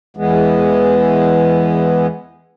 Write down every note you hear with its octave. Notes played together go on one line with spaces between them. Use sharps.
E2 E3 G#3 B3